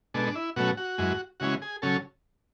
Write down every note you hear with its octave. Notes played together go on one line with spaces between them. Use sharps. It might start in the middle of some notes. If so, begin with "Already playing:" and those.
B2 G#3 D4 A4
D4
E4
B2 F#3 A3 C#4 F#4
F#4
F#2 E3 G#3
C#3 E3 G#3 C#4 F#4
G#4
C#3 F#3 C#4 A4